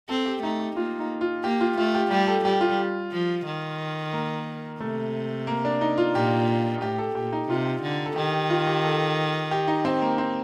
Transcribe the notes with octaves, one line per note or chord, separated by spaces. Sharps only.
C4 A4
G4
A3 D#4
G4
A#3 F4
D#4
F4
A#3 G4
F4
A3 F4
G4
G3 G4
A4
G3 G4
F4
F3
D#3
A#3
C3 A3
A#3
D4
D#4
F4
A#2 G4
A2 G4
A4
A#2 G4
D#4
C3 F4
G4
D3
A4
D#3 G4
G4
F4
G4
A4
G4
D#4
C4
A#3
C4